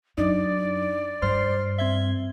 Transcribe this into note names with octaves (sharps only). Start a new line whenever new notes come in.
F#2 D4 D#4 D5
G2 C5 F6 C7
C4 E5 G#6 G7